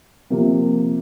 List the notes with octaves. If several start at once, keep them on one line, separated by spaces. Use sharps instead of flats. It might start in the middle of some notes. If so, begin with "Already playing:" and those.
C3 F3 A#3